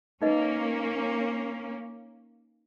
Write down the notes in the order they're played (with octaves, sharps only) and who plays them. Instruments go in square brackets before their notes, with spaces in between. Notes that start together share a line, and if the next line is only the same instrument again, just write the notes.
[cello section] A#3 C#4 [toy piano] D#4 B4 D#5